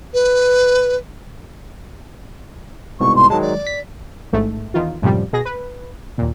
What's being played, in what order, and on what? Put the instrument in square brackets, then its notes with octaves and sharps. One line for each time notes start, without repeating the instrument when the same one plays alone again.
[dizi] B4
[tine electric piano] C2 G#2 B2 [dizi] C#6
[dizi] C6
[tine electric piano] D#3 F#3 G#3 [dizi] A5
[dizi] D5
[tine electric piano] B6
[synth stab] A1 G#2 A3
E2 D#3 F4
F#2 A2 C3 F3 G3
B2 G#4 A#6
B4
D#2 A#2